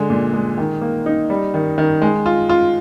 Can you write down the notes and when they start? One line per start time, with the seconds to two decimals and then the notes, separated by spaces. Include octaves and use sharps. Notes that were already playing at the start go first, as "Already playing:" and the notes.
Already playing: D3 G#3
0.10 A#2
0.34 G#3
0.58 D#3
0.82 A#3
1.06 D#4
1.30 G3
1.54 D#3
1.78 D#3
2.02 G#3
2.26 F4
2.49 F4